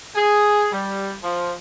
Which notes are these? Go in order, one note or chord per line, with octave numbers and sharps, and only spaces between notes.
G#4
G3
F3